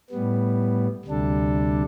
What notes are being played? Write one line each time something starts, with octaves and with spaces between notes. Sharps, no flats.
A2 G3 B3
D2 C3 G3 D4 A4